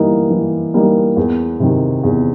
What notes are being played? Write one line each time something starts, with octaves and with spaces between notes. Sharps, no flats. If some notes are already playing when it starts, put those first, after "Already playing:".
Already playing: E3 G3 A#3 D#4
E3
G3 A#3 D#4
E2
C3 D#3
E2